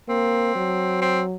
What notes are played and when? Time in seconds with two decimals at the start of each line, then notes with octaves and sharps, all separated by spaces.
0.08 A#3 C4
0.55 F#3
1.01 C4